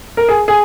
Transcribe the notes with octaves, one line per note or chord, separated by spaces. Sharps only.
A#4
G#4
G#4